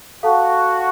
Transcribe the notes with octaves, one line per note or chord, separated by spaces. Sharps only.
F#4 A4 F5 A5